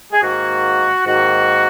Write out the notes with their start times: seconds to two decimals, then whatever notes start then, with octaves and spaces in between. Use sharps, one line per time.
0.12 G#4
0.22 G#2 D#3 A#3 F#4
1.06 G#2 D#3 A#3 F#4